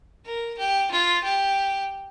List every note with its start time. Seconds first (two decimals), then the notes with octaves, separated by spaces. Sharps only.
0.26 A#4
0.58 G4
0.91 F4
1.24 G4